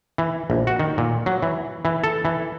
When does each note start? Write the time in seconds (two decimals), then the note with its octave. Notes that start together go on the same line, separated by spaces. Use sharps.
0.18 E3
0.50 A#1
0.67 F#4
0.80 D#3
0.98 A#2
1.26 F#3
1.42 E3
1.85 E3
2.04 A4
2.25 E3